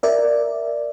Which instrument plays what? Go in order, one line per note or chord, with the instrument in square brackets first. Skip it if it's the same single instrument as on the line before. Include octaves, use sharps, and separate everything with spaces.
[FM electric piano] A#4 D5 E5